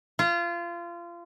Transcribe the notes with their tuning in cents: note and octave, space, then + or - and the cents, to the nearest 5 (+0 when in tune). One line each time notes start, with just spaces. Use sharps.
F4 -25